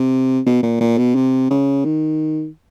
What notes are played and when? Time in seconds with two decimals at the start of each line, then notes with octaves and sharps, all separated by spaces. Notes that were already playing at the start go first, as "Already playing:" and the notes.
Already playing: C3
0.46 B2
0.63 A#2
0.81 A#2
0.98 B2
1.15 C3
1.51 C#3
1.85 D#3